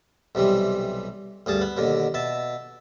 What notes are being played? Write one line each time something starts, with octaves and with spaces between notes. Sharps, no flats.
B1 C3 E3 G3
D2 G2 G#4 A5
B3
D#2 B2 D3
B2 E5 A5